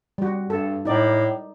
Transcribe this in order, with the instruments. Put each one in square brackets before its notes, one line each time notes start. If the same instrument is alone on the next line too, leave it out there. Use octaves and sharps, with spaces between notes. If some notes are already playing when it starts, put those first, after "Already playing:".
[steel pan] G3 F#4
[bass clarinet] G2 [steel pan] A4
[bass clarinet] A2 [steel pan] D#4 D5